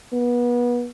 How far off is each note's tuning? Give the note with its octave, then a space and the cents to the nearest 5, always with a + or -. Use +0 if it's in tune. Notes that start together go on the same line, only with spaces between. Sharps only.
B3 -30